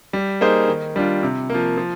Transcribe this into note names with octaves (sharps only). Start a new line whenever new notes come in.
G3
A#3 D#4 G#4 C5
D#3
G3 D4 F4
C3
F3 A#3
F3